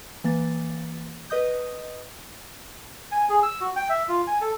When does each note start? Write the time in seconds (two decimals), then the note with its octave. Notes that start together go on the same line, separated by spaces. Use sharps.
0.24 E3 A#3 A6
1.30 B4 D#5 D#6 G6
3.12 G#5
3.30 G#4
3.43 E6
3.61 F#4
3.76 G5
3.89 E5
4.08 F4
4.27 G#5
4.41 A4